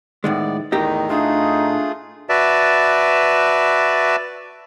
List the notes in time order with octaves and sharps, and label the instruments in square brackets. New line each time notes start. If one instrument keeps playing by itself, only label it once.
[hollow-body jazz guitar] A2 D#3 G#3 [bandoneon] B3 D5
[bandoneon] E2 D#3 D#4 [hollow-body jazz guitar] A2 G4 D#5
[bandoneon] A3 F4 G#4 [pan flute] D4 [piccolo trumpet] D#4
[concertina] F#4 B4 D5 E5 A5